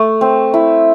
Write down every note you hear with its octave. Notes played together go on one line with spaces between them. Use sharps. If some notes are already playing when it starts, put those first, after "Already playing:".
Already playing: A3
C4
E4